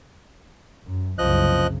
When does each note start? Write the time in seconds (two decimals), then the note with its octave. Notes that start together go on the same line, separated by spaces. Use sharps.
0.85 F#2
1.18 F#1 C2 C#3 F3 D#5 F#6